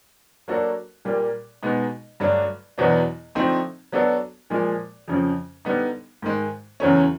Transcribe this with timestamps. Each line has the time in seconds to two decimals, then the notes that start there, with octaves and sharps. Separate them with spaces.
0.48 F#3 A#3 D4 F#4 A4
1.05 A#2 G3 A#3
1.63 B2 G#3 B3 D#4
2.20 G2 D3 F#3 A3 D4
2.78 E2 B2 F#3 B3 D4
3.35 D3 F3 A3 C4 D#4
3.92 F#3 B3 D4 F#4 A4
4.50 A#2 F3 G#3
5.08 F2 C#3 F3
5.65 D3 G3 B3 D#4
6.22 G#2 D#3 G#3
6.80 E2 C#3 F#3 A3 C#4